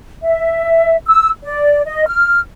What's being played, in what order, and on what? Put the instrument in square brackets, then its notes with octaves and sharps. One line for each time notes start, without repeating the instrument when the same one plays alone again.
[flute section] E5
E6
D5
D#5
F6